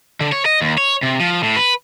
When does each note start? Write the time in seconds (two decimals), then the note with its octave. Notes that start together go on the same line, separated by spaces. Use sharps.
0.21 D3
0.32 C#5
0.45 D#5
0.61 D#2
0.78 C#5
1.03 C3
1.20 F3
1.43 A2
1.56 B4